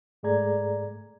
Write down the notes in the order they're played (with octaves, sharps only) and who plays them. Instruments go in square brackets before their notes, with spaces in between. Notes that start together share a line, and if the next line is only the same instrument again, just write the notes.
[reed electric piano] G#2 A3 G#4 D5 A#5 G#6